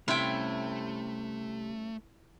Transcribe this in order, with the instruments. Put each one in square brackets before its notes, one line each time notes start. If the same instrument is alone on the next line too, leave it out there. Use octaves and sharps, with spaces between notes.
[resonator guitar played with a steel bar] C3 [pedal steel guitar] G3 C#4 F5 [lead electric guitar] A3 [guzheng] E4 G5